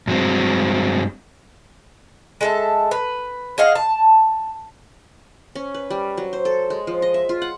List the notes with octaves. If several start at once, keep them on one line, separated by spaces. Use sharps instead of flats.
G2 F#3 G#3 C4
G#3 A4 E5
B4
G#4 D#5 F5 F#5
A5
C#4
B4
G3
F#3
C5
A4
G#3
F3
D#5
E5
F4
F#5